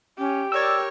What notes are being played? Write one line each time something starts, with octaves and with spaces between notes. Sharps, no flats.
C#4 G4
A#4 C#5 D5 G5 E6 G#6